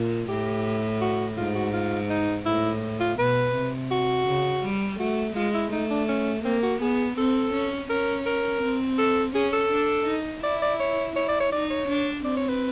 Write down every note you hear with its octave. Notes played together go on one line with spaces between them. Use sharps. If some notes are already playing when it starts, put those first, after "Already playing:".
Already playing: A#2
A2 G4
F#4
G#2 F4
F#4
F4
D#4
A2 E4
F4
B2 B4
C3
F#4
C#3
G3
A3 F#4
G#3 F4
E4
A3 D#4
D4
C#4
A#3 C4
F#4
B3 G#4
C4 A4
C#4
C#4 A#4
A#4
C4
A4
C#4 G#4
A4
D4
D#4
E4 D5
D5
C#5
E4 C#5
D5
C#5
D#4 D5
C#5
D4
C4 D5
C#5
B4